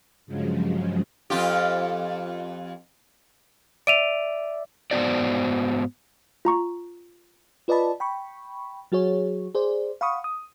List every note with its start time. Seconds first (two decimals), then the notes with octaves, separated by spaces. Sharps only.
0.26 G2 C#3 F3 F#3 G#3
1.30 F2 F4 G4
3.87 D5 E5 D7 D#7 F7
4.91 G#2 B3 F#4 C5 D5
6.45 F4 A#5 C#6
7.68 F4 B4 D5 D#5 A5 B5
8.00 G5 B5 C#6
8.92 F#3 F#4 G#4 C#5
9.55 G#4 C5 D5
10.01 F5 F#5 B5 C#6 D#6
10.24 D#6